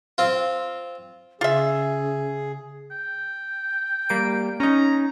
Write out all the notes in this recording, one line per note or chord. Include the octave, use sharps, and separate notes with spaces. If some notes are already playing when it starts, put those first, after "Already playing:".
C4 F4
C#3 F4 G#4 E5
G5
G3 A#3 D7
C#4 D#4 A#5